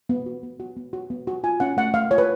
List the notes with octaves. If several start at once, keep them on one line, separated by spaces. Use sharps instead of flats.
B3
F#4
B3
F#4
B3
F#4
B3
F#4
F4 G#5
C#4 F#5
A3 F#5
A3 F5
F4 C#5
B4